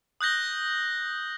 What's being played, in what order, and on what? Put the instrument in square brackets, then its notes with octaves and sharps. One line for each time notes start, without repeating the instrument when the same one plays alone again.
[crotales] D#6 F#6 G6 A#6 G7